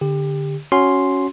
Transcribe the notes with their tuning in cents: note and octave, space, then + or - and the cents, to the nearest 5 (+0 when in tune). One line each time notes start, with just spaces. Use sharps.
D3 +0 G4 +20
C#4 +0 F#4 +0 C6 +0